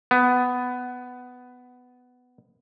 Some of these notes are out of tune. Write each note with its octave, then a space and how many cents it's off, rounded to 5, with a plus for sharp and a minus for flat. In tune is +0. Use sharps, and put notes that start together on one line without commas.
B3 +10